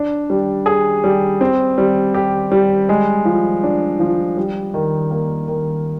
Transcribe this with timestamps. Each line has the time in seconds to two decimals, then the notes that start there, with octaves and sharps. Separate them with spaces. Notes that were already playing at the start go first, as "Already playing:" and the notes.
Already playing: D4
0.30 G3
0.66 G#4
1.04 G3
1.41 C4
1.78 G3
2.14 G4
2.52 G3
2.89 G#3
3.25 F3
3.63 D4
4.00 F3
4.37 G3
4.74 D#3
5.11 A#3
5.48 D#3